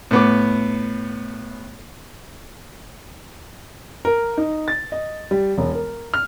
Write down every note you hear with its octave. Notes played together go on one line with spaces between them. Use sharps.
A2 B3 D6
A#4
D#4
A6
D#5
G3
E1
A#4
F6